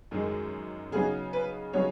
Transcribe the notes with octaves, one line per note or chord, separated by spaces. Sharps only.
F#2 D#3 G#3 D#4
C#3 F#3 B3 D#4 G#4
B4
C#3 F#3 B3 D#4 C#5